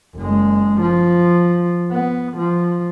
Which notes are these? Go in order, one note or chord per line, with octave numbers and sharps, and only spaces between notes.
F#1 G#3
F3
B3
F3